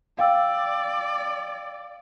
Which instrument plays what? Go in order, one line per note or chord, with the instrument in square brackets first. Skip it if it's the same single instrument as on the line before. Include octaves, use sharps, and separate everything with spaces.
[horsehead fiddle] D5 [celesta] F5 G5 E6